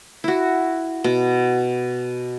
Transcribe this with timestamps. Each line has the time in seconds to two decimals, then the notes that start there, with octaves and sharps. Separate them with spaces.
0.24 E4 F#4
1.04 B2